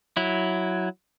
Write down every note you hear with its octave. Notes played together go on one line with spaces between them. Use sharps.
F#3 E4